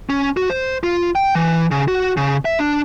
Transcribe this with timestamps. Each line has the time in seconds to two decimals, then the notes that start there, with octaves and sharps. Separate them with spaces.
0.10 C#4
0.37 F#4
0.50 C5
0.84 F4
1.15 G5
1.35 E3
1.71 C#3
1.88 F#4
2.17 C#3
2.45 E5
2.59 D4